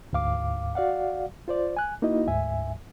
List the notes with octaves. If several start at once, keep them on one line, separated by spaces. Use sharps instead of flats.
D2 G#2 F5 D6
F#4 D5 F5 F#5
F4 C5 D5
G#5 F#6
A#3 D#4 E4 F#4 D#5
D2 G#2 E5 G#5